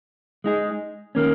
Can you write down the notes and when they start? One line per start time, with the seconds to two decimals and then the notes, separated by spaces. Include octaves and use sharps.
0.44 G#3 D#4 G#4
1.15 D#3 A#3 C#4